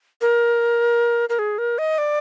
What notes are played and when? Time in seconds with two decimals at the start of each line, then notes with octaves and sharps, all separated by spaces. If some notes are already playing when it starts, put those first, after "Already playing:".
0.21 A#4
1.29 A#4
1.39 G#4
1.58 A#4
1.78 D#5
1.98 D5